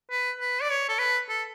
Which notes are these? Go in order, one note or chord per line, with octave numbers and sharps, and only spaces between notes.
B4
B4
D5
C#5
A4
B4
A4